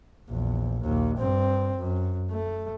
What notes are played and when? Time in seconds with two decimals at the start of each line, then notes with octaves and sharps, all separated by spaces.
0.28 A#1 E2
0.81 A#1 D#2
1.18 G2 C4
1.78 F#2
2.31 A3